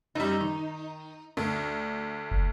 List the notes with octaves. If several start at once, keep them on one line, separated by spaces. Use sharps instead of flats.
F#2 G3 D#4
D#3
D2 D4
F#1